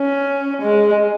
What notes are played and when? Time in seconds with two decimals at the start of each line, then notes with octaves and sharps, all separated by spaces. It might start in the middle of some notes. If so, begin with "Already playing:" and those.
Already playing: C#4
0.62 G#3